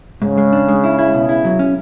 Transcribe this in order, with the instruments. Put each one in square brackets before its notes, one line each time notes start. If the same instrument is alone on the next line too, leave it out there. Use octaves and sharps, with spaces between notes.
[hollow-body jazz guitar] G#2 [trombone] C#3
[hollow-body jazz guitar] G#3
D4
G#3
E4
E4
B2
E4
F#3
C#4